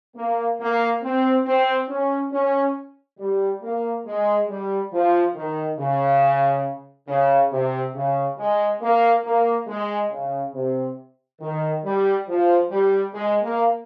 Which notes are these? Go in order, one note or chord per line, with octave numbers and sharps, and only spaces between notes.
A#3
A#3
C4
C4
C#4
C#4
G3
A#3
G#3
G3
F3
D#3
C#3
C#3
C3
C#3
G#3
A#3
A#3
G#3
C#3
C3
D#3
G3
F3
G3
G#3
A#3